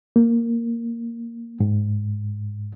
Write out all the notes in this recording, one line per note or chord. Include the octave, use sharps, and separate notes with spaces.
A#3
G#2